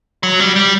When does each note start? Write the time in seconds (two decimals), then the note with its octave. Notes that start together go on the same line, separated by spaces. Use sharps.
0.23 F#3
0.40 G3
0.56 G3